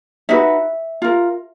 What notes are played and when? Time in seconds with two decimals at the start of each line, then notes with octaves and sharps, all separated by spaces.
0.29 D#4 F#4 B4 E5
1.02 F4 A#4